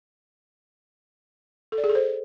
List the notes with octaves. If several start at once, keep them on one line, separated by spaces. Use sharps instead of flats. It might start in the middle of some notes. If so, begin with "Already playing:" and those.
A4
D5
G#4
A4
C5